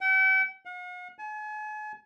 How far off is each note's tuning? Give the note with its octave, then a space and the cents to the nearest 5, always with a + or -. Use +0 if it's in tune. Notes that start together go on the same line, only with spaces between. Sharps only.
G5 -45
F#5 -45
G#5 +40